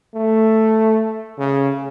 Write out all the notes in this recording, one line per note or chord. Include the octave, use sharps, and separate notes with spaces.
A3
C#3